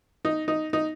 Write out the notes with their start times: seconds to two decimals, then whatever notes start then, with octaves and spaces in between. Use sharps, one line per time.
0.25 D#4
0.48 D#4
0.73 D#4